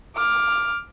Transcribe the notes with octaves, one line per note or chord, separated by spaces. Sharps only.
D6 F6